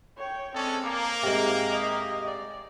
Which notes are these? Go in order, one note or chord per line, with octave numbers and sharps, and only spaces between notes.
C#5 G5
G#3 C4 C#4 A4 D5
A#3 D6
G#2 C3
G4 D#5
D5